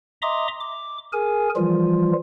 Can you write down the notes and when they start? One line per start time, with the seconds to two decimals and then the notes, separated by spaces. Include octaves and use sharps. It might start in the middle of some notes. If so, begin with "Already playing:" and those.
0.22 D#5 E5 A#5 C6 D6 D#6
0.60 D6
1.13 G#4 A#4 G#5
1.56 E3 F3 G3 F4